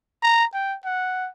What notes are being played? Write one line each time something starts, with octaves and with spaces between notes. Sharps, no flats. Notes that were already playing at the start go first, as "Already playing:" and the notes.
A#5
G5
F#5